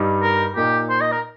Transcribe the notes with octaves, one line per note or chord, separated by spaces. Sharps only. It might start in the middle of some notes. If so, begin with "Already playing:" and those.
Already playing: G2 G3 D#4
A#4
A#2 A#3 D#4 G4
C5
D#5
A#4